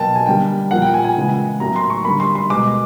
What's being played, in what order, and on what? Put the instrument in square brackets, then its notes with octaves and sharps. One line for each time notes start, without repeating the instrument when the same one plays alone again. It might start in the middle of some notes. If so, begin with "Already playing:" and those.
Already playing: [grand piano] B2 F#3 A#3 G5 A5
G#5
D3 G3 A#3 G5
A#2 F3 A#3 F#5
G5
G#5
G#5
C#3 E3 G#3
A2 F#3 A#3 A#5
C6
C#6
D3 G3 A#3 B5
C6
C6
B2 G#3 D6